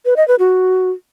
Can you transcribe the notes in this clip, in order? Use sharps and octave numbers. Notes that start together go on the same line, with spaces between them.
B4
D#5
B4
F#4